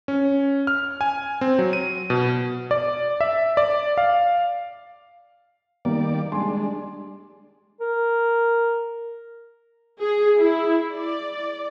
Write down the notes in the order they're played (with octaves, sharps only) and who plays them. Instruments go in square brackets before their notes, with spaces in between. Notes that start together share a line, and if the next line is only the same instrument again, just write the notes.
[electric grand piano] C#4
F6
G#5
C4
F#3
D#7
B2
D5
E5
D5
F5
[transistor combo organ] D#3 G3 D5 [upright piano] A#3
[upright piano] G3 G#5 C6 [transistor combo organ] G#3 D4
[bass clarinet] A#4
[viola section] G#4
E4
D5